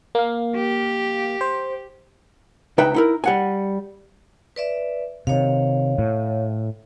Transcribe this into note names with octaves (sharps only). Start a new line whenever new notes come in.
A#3 F5
G4
C5
C#2 D#4 B4 E5 G5
D#4 E4 A#4
G3 F#5 G#5
B4 D5 E5
C3 D#3 C#5 F5
A2